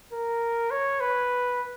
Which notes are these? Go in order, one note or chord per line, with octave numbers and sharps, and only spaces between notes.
A#4
C#5
B4